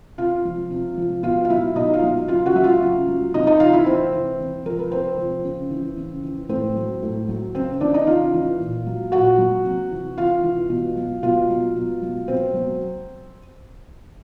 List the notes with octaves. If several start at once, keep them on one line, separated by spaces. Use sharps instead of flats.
C3 F4 F5
F3
C3
F3
B2 F4 F5
F5
F#3 E4 E5
B2 D#4 D#5
F4 F5
F#3
C#3 F4 F5
F#4 F#5
F#3 E5
F4 F5
C#3
F#3
C3 D#4 D#5
D#4 D#5
E3 F4 F5
E4 E5
C3 C4 C5
E3
C3
F3 A#4
B4
C3 C4 C5
F3
C#3
E3
C#3
E3
A2 C4 C5
F#3
A2
F#3
C#3 C4 C5
E3 D4 D5
D#4 D#5
C#3 F4 F5
E3
A#2
F#3
A#2 F#4 F#5
F#3
C3
E3
C3 F4 F5
E3
B2
F#3
B2 F4 F5
F#3
B2
F#3
B2 C4 C5
F#3